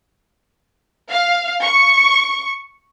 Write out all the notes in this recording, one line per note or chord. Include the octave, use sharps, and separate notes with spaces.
F5
C#6